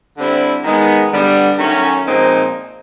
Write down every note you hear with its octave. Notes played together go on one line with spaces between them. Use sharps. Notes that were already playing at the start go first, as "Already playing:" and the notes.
D3 G3 C4 E4
D#3 G#3 B3
D3 G3 B3
D#3 F#3 A3 C#4
A#2 F3 G#3 C4 D#4